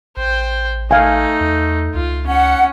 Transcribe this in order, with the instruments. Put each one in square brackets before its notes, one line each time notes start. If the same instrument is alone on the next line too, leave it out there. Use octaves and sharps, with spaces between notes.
[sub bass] A1 [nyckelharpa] C5 G5
[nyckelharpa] A3 D#4 [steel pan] F5 G#5
[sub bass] E2
[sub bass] C#2 [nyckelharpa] F4
[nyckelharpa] C#4 [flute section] F#5